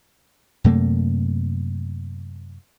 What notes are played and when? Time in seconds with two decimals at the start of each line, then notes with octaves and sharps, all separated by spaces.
0.64 F#2 C3 A3 A#3